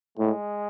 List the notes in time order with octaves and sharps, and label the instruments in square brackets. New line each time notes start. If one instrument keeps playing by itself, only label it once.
[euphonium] A2 [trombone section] G#3